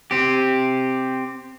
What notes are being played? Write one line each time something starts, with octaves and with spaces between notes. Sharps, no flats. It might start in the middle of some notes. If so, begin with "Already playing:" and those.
C4 G4